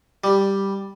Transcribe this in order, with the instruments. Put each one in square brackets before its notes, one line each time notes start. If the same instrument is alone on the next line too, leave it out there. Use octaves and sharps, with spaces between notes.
[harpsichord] G3